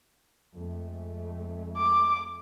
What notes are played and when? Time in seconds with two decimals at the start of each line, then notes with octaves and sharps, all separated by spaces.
0.54 F2 G#3 A3
1.78 D6